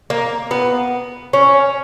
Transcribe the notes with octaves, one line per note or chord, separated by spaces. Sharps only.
A#3
B3
C#4